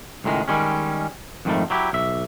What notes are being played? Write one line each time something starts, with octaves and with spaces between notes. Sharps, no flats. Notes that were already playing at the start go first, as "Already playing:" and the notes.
C#2 A2 D#3 G#3
D#3 G3 G#3 C#4
F2 G#2 D#3 F3 G3 A3
F#3 E4 G4
B1 E5